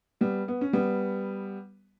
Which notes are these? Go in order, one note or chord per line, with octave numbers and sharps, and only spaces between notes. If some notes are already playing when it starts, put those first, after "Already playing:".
G3 B3
B3
C#4
G3 B3